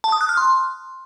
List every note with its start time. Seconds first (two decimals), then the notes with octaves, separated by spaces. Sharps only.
0.04 A5
0.12 D#6
0.21 F#6
0.29 F6
0.37 C6